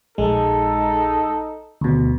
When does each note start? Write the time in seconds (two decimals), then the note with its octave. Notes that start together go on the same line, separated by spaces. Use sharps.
0.18 A#1 G#3 D#4 A4
1.81 D2 B2